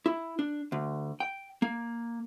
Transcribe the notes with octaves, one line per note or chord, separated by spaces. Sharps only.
E4
D4
D2
G5
A#3